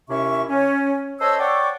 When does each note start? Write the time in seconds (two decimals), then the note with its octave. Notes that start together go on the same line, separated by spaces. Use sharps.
0.09 D#2 C3 C#4 E4 E5 C#6
0.48 C#4
1.20 A4 C5 C#5 D#5 E6
1.39 C#5 D5 F#5 G5 C#6 D6